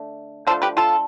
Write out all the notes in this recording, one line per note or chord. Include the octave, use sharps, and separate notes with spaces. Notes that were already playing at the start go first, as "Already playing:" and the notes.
Already playing: D3 A3
D3 F3 A3 A4 C5
G4 B4
F4 A4